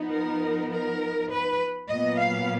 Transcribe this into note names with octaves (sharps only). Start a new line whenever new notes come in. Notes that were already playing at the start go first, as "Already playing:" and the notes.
Already playing: F3 B3 D#4
A#4
A#4
B4
A#2 F#3 B3 D#5
F5